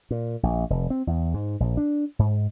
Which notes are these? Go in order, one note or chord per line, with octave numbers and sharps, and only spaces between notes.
A#2
A#1
F1
C4
E2
G#2
A#1
D4
G#2